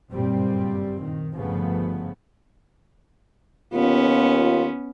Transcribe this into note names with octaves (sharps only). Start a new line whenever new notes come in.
F#1 G2 A#2 G3 C4
D#3
G1 G2 C#3 F3 A3 B3
D#2 B3 C#4 F4